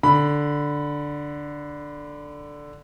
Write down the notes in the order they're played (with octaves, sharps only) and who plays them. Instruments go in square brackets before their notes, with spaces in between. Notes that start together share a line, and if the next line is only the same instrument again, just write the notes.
[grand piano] D3 B5